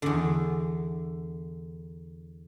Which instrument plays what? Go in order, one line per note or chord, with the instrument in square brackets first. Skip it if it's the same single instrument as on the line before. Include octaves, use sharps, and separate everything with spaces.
[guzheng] E2 D3